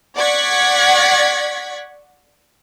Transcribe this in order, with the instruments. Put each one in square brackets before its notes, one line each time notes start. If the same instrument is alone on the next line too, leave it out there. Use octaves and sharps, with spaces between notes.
[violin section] D5 F#5 C#6 G#6 B6